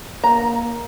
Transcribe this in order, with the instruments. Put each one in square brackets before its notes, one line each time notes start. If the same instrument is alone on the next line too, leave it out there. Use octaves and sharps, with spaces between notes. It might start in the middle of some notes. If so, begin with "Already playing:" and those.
[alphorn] A#3 [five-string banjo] A#5